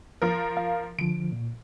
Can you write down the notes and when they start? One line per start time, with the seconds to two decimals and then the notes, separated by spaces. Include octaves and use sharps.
0.22 F3 A#4
0.57 F5
0.99 D3 F3 D7
1.32 A#2